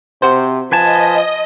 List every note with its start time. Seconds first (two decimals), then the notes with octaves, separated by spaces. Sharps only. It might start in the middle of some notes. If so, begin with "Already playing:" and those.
0.22 C3 F#4 C5
0.72 F3 B4 D#5 G#5 A5